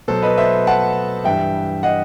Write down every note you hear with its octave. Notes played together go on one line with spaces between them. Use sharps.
B2 F#3 A4 C5
B4 D#5
C5 E5
F#5 A5
G2 E3 G3 E5 G5
D#5 F#5